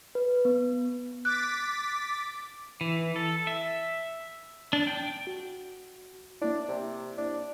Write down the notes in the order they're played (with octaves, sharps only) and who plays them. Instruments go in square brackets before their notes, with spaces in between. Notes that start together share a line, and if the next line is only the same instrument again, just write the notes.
[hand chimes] B4
B3
[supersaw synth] D6 A6 B6 [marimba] F#6
[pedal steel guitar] E3
A4
E5
D4
G5
[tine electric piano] F#4
[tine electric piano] A#3 E4 [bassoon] D4
[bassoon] C3
D4